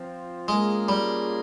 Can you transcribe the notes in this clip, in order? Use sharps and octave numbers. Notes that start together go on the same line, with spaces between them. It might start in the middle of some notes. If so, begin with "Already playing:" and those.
Already playing: F3 C4 F4
G#3 A#3 C#4 F4 G#4
G3